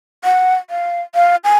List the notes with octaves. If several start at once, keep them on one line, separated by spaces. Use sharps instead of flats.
F#5
F5
F5
G#5